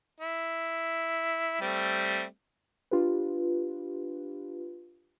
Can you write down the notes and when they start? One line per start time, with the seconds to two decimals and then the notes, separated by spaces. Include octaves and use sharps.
0.20 E4
1.62 G3 A3 C4
2.91 D4 F4 G4 B4